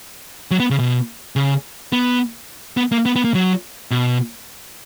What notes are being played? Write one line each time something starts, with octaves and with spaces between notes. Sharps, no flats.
F#3
B3
C#3
B2
C#3
B3
B3
A#3
B3
B3
A#3
F#3
B2